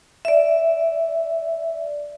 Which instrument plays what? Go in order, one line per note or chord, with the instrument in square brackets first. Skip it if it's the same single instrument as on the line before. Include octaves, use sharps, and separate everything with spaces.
[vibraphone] D5 E5